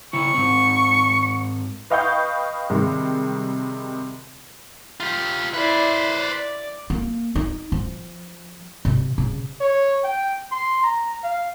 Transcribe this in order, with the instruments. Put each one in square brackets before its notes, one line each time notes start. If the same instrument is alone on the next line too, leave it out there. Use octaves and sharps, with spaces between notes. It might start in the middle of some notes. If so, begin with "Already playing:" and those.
[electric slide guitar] C#3 E4 [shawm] C#6
[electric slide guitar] G#2 C4
[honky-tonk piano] B4 D#5 F5 G5 C#6 G6
C3 D#3 G3 G#3
[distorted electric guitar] F4 G4
[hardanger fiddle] E4 D5 [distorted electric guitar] B4 C5
[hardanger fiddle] D5
[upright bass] A#3
D#4
F3
C3
C#3
[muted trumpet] C#5
G5
C6
A#5
F5